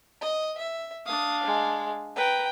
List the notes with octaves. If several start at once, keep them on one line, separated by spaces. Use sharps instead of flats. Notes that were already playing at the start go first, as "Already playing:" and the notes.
D#5
E5
D4 F5 D#6
G#3
B4 G5 A#5